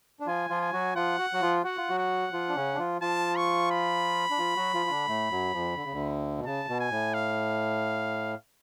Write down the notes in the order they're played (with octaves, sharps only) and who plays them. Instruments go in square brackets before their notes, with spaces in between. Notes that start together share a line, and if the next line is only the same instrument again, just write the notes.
[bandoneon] D4
[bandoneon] F3 F4 [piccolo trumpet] G#5
[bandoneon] F3 F4
[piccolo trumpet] G#5
[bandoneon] F#3 F#4
[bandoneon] F3 F4 [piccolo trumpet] F#5
[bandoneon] F#4
F#3 F#4
F3 F4
[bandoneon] F#4 [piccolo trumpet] F#5
[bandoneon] F4
F#3 F#4
[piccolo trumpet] F#5
[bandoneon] F3 F4
D4
C#3 C#4
D4
F3 F4
[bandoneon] F3 F4 [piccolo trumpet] A5
[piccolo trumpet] C#6
B5
[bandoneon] D4
F3 F4
F#3 F#4
F3 F4
F4
D3 D4
A2 A3
F#2 F#3
F2 F3
D3
C#3
D2 D3
B2
[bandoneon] C#3 [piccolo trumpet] A5
[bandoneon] B2
[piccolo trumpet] G#5
[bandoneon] A2
[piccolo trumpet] F5